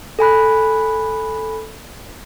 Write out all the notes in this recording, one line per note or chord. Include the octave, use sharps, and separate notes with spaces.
A4 G#5 B5 F#6